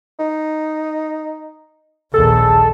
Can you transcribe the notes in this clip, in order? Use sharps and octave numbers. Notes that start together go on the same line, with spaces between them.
D#4
A#1 D#2 G#4 A4